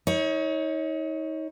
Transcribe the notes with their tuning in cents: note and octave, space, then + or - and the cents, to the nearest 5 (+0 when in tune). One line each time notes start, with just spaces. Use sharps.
D#4 +35 C#5 +0